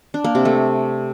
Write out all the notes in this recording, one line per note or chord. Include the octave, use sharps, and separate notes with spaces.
D4
A#3
C3
A3